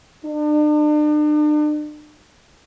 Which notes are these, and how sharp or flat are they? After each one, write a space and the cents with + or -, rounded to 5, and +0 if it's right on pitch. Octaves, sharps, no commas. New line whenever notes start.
D4 +40